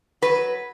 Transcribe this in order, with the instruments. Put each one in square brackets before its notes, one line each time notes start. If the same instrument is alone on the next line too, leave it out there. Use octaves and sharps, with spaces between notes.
[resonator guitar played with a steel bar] F#3 B4